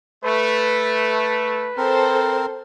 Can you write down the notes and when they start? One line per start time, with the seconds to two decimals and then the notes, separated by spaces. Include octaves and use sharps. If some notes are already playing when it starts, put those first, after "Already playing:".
0.24 A3 B4
1.77 C4 A4 A#4 C5